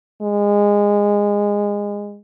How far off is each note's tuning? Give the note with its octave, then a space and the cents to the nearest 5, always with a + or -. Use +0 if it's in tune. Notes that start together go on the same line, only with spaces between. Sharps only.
G#3 -20